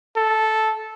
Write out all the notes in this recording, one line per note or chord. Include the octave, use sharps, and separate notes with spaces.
A4